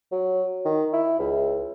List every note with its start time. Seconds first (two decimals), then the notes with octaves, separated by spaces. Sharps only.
0.12 F#3
0.66 D#3
0.93 E4
1.19 C#2